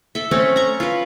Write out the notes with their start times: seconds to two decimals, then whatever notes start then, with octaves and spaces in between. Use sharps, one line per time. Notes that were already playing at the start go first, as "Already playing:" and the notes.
0.15 A4 E5
0.31 A3 C4 C#4
0.56 A#5 C#6
0.80 F4 B4